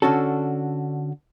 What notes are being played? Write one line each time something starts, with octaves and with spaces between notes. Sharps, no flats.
D3 C#4 D4 F#4 A4